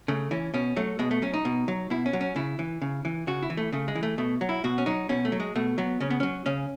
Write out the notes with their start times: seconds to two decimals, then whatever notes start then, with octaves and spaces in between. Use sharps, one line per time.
0.08 C#3 A3
0.31 E3 C#4
0.54 B2 C#4
0.76 F#3 A3
0.99 B2 G#3
1.11 A3
1.22 F#3 C#4
1.34 D#4
1.45 B2
1.68 F#3
1.90 B2 E4
2.06 C#4
2.13 F#3
2.21 C#4
2.36 C#3 E4
2.59 E3
2.82 C#3
3.05 E3
3.27 C#3 F#4
3.42 E4
3.50 E3
3.57 A3
3.73 C#3 A3
3.88 G#3
3.95 E3
4.03 A3
4.18 B2 A3
4.41 F#3
4.49 E4
4.64 B2 F#4
4.78 C#4
4.86 F#3 D#4
5.09 B2 C#4
5.25 A3
5.32 F#3
5.40 G#3
5.55 B2 A3
5.78 F#3 B3
6.00 C#3 C#4
6.10 B3
6.20 F#3 C#4
6.46 C#3 C#4